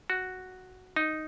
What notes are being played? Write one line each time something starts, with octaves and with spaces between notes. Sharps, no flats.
F#4
D#4